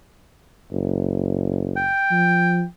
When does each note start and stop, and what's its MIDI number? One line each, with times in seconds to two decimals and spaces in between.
0.72 1.91 30
1.76 2.64 79
2.11 2.64 53